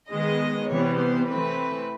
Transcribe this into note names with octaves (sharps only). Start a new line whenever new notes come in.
D#3 G#3 B3 D#5
C3 E3 G3 B3 C#5
C5
E3 A3 C4 B4